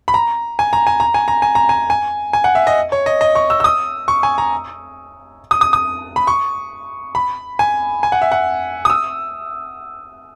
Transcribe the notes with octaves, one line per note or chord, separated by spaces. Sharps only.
B5
A#5
G#5
A#5
G#5
A#5
G#5
A#5
G#5
A#5
G#5
G#5
G#5
F#5
E5
D#5
C#5
D#5
D#5
C#6
E6
E6
D#6
C#6
G#5
A#5
D#6
D#6
D#6
B5
C#6
B5
G#5
G#5
F#5
E5
F#5
D#6
E6